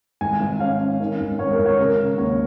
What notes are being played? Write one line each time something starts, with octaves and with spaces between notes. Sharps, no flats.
G#1 G#5
G#1
C#4 F5
C#4
D#3
G#1
G#1 C#5
A#4
G#1
C#5
C#3 A#4
C#3
D#2 C#5